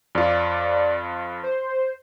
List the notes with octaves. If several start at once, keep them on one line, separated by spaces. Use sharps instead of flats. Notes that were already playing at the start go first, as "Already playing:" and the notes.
F2 F4 D5
C5